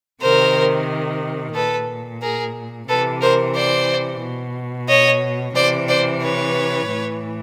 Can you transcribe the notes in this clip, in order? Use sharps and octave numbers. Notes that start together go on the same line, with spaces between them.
C3 D#3 A#4 C5
A#2 A4 B4
G#4 A#4
C3 E3 A4 B4
A#4 C5
C5 D5
B2
C#5 D#5
C3 E3 C5 D5
C5 D5
B4 C#5
A2 E3